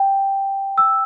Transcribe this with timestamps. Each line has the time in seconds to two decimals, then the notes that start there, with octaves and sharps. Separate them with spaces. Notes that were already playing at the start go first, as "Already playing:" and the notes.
Already playing: G5
0.78 E6